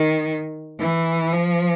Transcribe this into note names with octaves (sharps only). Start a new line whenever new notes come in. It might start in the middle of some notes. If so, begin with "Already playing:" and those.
Already playing: D#3
E3
F3